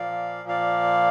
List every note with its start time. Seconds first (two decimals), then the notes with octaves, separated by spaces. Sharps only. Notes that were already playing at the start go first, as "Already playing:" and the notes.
Already playing: A#2 F3 A#3 D5 F5
0.49 D5 F5